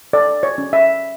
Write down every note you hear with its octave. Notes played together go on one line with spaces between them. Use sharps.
A4 D5
C#5
C#4
E5